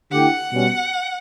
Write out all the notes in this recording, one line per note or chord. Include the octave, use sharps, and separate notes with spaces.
D3 A3 E4 G4 F#5
B2 G3 C#4